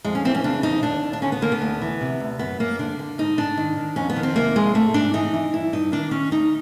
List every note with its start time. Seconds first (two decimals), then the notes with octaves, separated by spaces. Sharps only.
0.04 F2 G#3
0.15 C#4
0.25 E3 C4
0.35 C#4
0.44 C#3 D4
0.63 F2 D#4
0.83 D#2 D4
1.03 D#2
1.13 D4
1.22 D3 C#4
1.32 B3
1.42 D3 A#3
1.52 B3
1.61 D2
1.82 E3
2.01 C3
2.20 D2
2.39 F#2 B3
2.59 F#2 A#3
2.79 D3 D4
2.99 D3
3.18 G#2 D#4
3.37 G#2 D4
3.57 D#3
3.77 D#3
3.96 F2 C#4
4.10 B3
4.16 D#3
4.23 C4
4.36 C3 A#3
4.56 F2 G#3
4.75 G#2 A3
4.94 G#2 D4
5.13 E3 D#4
5.34 E3
5.53 G2 E4
5.73 G2 D#4
5.92 D#3 D4
6.11 D#3 C#4
6.32 D2 D#4